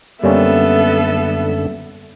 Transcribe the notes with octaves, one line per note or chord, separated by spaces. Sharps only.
F#2 D3 G3 A#3 B3 C#4 A4 E5